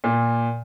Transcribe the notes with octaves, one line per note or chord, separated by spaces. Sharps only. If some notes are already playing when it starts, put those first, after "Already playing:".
A#2